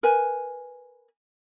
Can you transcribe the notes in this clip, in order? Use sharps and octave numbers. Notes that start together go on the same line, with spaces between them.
A#4 B4 G#5